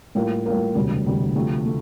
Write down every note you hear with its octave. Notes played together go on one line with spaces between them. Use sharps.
A2 G3 A#3 F4 A#4
A2 G3 A#3 F4 A#4
E1 D2 C3 G3
E1 D2 C3 G3
D2 C3 F3 A3
A3